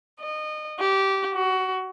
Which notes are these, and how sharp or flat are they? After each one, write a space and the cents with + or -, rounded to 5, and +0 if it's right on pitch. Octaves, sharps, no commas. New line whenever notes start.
D#5 -25
G4 -20
F#4 +20